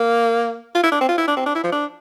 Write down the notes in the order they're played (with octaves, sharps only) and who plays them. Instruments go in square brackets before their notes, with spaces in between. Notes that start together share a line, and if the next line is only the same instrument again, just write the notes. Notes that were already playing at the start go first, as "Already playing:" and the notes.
Already playing: [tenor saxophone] A#3
F4
E4
D4
C4
F4
E4
D4
C4
D4
E4
F3
D4